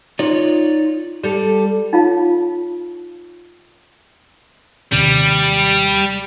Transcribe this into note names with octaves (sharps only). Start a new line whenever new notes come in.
D#4 F4 C#5 D5
G3 A4
D#4 F4 C#5 F5 A5
D#2 C3 G3